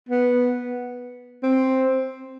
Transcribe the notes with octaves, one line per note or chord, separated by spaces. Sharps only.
B3
C4